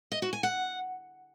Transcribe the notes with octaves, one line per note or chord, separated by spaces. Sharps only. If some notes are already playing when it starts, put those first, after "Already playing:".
D#5
F#4
G#5
F#5